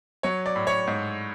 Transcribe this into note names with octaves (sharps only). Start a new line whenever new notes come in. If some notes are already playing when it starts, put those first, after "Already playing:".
F#3 C#5
D5
A2
C#5
G#2